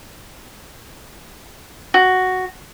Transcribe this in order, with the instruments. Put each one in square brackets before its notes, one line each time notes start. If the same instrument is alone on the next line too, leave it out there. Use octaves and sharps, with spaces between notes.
[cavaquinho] F#4